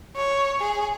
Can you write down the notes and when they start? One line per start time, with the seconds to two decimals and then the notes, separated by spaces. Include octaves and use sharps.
0.16 C#5
0.60 G#4